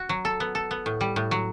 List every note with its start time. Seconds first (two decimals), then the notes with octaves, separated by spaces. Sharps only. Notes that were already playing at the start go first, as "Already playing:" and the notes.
Already playing: F#4
0.09 F#3
0.25 A4
0.40 B3
0.55 A4
0.71 B3
0.86 A2
1.01 G3
1.16 A2
1.31 F#3